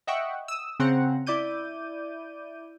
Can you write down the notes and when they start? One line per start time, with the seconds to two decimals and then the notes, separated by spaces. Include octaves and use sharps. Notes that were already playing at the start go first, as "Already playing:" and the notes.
0.07 D#5 E5 F#5 G5 C#6
0.48 D#6 E6
0.80 C#3 C4 F#5 A#5
1.27 E4 D5 D6 G6 D#7